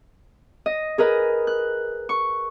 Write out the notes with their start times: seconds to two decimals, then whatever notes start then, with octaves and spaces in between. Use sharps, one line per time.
0.66 D#5
0.98 G#4 A#4 B4 D#5
1.47 F#6
2.09 C#6